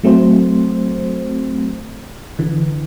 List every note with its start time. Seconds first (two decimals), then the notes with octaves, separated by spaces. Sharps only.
0.03 F#3 A3 C4 C5
2.39 D3 E3